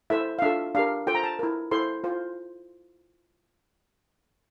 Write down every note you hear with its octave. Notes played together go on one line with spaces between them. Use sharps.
E4 A4 C5 E5
F5
D4 F4 A4 E5
D4 G4 A#4 F5
F4 A4 C5 G5
A#5
A5
E4 A#4
E4 A4 C5 C6
F4 C5